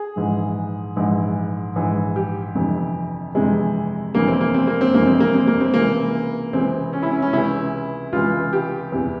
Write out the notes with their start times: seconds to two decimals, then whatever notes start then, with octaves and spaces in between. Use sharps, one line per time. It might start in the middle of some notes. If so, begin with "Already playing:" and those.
Already playing: G#4
0.16 A#1 G#2 E3
0.96 A#1 G#2 E3
1.76 A#1 G#2 E3
2.16 G4
2.55 G1 F2 C3 E3
3.35 G1 F2 C3 E3 G#3
4.14 G1 F2 C3 E3 A#3
4.28 C4
4.41 A#3
4.54 C4
4.67 A#3
4.81 C4
4.94 G1 F2 C3 E3 A#3
5.07 C4
5.20 A#3
5.34 C4
5.47 A#3
5.60 C4
5.74 C#2 C3 E3 A#3
6.53 C#2 C3 E3 C4
6.93 C#4
7.03 E4
7.11 C#4
7.22 C#4
7.33 C#2 C3 E3 E4
8.13 C#2 C3 E3 F4
8.53 G4
8.92 E2 C3 E3